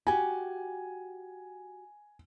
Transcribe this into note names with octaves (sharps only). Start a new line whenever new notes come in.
F#4 G4 G#5